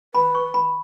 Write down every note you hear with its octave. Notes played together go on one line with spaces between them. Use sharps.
B4 B5
C#6
B5